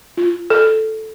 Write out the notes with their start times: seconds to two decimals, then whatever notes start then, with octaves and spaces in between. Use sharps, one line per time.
0.17 F4
0.50 A4